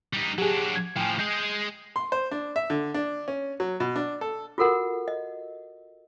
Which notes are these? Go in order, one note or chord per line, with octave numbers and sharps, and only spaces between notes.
G3 D#4
F#3 D4 G4 G#4
G#6
A2 F3 G5 G#5
G#3 G#4 G6
C6
C5
D4
E5
D3
D4
C#4
F#3
B2
D4
A4
F4 F#4 A4 A#4 F#5
D#5